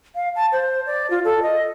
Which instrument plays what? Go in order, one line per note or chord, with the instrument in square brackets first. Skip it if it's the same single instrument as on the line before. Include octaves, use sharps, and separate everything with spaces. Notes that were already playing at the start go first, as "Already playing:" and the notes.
[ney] F5
A5
C5
D5
F4
A4
D#5